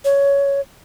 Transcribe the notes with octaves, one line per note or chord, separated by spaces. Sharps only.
C#5